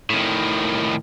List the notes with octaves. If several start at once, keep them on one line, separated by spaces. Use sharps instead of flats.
A2 D#3